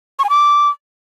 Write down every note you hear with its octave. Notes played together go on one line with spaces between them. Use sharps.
C#6
G#5
D6